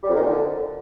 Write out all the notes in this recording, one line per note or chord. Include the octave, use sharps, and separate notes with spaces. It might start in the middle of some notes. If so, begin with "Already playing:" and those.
G3
F2
D#3
A#2
D3